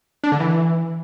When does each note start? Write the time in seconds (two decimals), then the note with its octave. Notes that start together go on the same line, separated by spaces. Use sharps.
0.24 D4
0.32 D3
0.40 E3